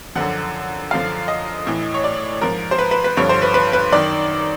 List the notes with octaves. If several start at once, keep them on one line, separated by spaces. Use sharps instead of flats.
F#2 D3 F3 F#5
F#2 D3 F3 F5
D#5
A2 E3
C#5
D5
G#2 F3 A#4
C5
B4
B4
B4
G2 D3 F3 C#5
C5
B4
B4
B4
F#2 D#3 D5